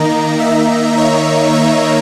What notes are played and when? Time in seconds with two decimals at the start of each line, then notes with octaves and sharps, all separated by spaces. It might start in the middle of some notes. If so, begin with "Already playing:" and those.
Already playing: D#3 A#3 D#4 A#5
0.40 E5
0.97 C#5
1.53 E5